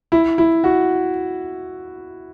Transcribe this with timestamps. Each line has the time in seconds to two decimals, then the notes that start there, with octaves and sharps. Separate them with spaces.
0.12 E4
0.38 E4
0.64 F#4